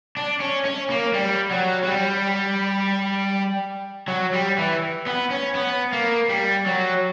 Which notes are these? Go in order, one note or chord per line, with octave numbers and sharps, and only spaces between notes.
D4
C#4
C#4
A#3
G3
F#3
F#3
G3
F#3
G3
E3
B3
C#4
B3
A#3
G3
F#3